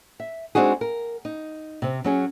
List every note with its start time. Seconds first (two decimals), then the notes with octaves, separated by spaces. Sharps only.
0.20 E5
0.55 G#3 C4 D4 D#4 F#4 G#4
0.81 A#4
1.25 D#4
1.82 C3 C4
2.04 F#3 C#4 G#4